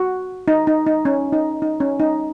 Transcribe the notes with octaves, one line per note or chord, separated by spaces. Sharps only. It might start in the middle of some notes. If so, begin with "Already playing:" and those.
Already playing: F#4
D#4
D#4
D#4
C#4
D#4
D#4
C#4
D#4